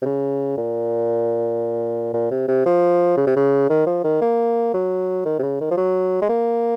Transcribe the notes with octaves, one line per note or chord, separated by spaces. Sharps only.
C3
C#3
A#2
A#2
C3
C3
F3
C#3
C3
C#3
D#3
F3
D#3
A#3
F#3
D#3
C3
C#3
D#3
F3
F#3
G#3
A#3